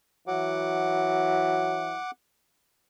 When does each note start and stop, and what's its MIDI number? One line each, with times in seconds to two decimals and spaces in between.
0.28 1.99 52
0.28 1.96 54
0.28 2.11 78
0.28 2.11 86